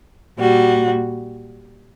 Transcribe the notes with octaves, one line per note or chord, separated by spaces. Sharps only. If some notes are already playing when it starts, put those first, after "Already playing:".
A#2 G3 F#4